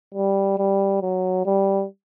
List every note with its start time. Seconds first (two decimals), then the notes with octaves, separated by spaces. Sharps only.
0.14 G3
0.58 G3
1.02 F#3
1.46 G3